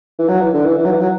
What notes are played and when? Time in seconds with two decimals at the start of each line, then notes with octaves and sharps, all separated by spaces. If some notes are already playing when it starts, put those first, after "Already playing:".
0.19 E3
0.29 F#3
0.41 E3
0.54 D3
0.65 E3
0.78 E3
0.85 F#3
0.92 E3
1.00 F#3